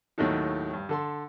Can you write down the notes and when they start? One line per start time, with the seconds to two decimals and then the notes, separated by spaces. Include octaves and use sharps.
0.18 D#2 A2 D#3 F#3 A3 D#4
0.73 G2
0.89 D3 A4 C6